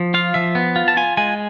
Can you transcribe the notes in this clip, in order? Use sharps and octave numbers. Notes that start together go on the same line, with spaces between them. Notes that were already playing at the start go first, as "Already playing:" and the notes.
Already playing: F3
F4 F5
F3 E5
B3
F4
A5
F4 G#5
G#3 G#5